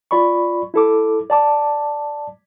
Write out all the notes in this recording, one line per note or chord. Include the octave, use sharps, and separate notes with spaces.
F4 D5 B5 C#6
E4 A4 D6
D5 A5 D6